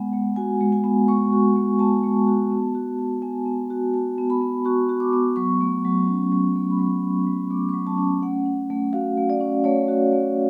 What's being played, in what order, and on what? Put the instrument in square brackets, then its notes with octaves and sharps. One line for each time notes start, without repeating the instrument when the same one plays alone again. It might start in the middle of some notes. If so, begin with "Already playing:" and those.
Already playing: [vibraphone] G#3 B3 F#5
G#3
F#4 G#5
G#3
G#5
B3
G#3 C#6
F#4
G#3
B3 A5
G#3
F#4
B3
F#4
F#4
B3 G#5
B3
F#4
F#4 A5
B3
B5
B3
F#4 C#6
F#4
D6
B3
F#3 C#6
A3
F#3
C#4
F#3
A3
B5
F#3 C#6
C#4
F#3
A3 D6
F#3 C#6
A5
C#4
A5
A3 F#5
C#4
A3
F#4 F5
A3
D5
C#4
A3 C#5
F#4
A3